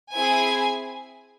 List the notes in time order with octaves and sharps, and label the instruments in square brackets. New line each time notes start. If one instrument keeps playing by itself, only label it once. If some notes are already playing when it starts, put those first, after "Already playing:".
[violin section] C4 E4 G#4 G#5